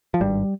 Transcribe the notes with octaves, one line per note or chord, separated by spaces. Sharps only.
F3
G#1 G2 G3